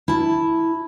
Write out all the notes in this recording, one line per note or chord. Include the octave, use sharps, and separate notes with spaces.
E4 A5